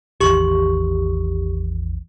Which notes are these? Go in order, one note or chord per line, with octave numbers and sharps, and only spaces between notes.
A1 E2 D#3 G4 C#6